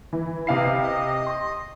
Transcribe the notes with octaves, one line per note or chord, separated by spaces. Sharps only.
E3
C3 E4 B4 D#5 F5 C7
D#5
C6